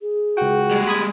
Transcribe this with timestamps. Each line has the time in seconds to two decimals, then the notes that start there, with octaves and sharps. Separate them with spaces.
0.01 G#4
0.37 C#2 F#4 G5
0.71 G3 G#3
0.87 B5 D#6 G#6